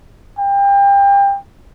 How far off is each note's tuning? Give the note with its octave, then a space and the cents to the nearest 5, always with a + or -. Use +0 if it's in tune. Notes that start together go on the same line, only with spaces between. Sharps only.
G5 +30